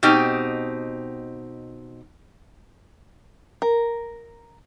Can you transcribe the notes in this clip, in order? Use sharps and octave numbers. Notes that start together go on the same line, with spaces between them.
B2 C4 D#4 G4
A#4